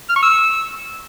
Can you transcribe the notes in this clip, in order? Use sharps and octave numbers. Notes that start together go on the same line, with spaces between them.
F6
C#6
E6